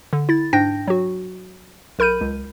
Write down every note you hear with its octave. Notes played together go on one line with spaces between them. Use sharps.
D3
E4 A6
G#2 D4 G5 G6 A#6
F#3 F#4
B1 A#4 B5 G6 D#7
C#2